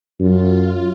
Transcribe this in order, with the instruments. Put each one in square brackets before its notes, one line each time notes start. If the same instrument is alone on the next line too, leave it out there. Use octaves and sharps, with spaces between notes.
[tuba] F#2 [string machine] F4